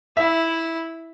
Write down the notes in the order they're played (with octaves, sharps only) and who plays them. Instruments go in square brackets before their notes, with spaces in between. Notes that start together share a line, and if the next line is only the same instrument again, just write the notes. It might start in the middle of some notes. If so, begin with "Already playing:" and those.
[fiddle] E4 [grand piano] E5